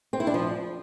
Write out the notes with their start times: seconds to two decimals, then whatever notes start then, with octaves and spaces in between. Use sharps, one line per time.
0.13 C4
0.20 E4
0.27 D4
0.34 F3